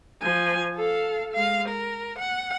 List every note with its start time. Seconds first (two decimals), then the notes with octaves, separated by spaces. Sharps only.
0.22 F3 G#5
0.75 A4 F5
1.32 G#3 F5
1.68 A#4
2.18 F#5